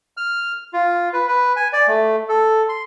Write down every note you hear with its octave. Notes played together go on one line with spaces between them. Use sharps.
F6
F4
B4
B4
G#5
D5
A3
A4
C6